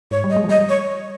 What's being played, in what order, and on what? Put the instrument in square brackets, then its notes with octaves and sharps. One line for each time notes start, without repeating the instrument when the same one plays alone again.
[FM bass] G#2 [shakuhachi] C#5
[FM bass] G3
[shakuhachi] D#5
[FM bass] G#3
F3
[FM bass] G3 [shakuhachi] D#5
[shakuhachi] C#5